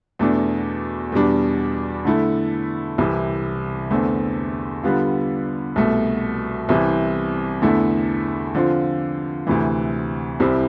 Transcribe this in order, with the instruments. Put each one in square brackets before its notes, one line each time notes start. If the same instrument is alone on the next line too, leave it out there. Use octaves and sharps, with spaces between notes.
[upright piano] E2 B2 A3 D4
E2 B2 G3 D4
D3 A3 E4
C2 C3 E3
E2 D3 A3 C4
D3 G3 B3 F4
C2 B2 A3
C2 C3 E3
E2 D3 A3 E4
D3 F3 C4 F4
D2 C3 E3
C2 C3 G3 C4 E4